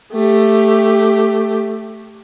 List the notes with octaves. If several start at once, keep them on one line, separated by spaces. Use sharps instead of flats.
A3 G4